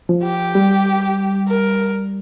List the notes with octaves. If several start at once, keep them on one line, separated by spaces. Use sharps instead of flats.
F3
G4
G3
A#4